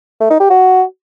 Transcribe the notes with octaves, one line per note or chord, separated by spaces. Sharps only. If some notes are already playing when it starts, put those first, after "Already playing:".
A3
D#4
G4
F#4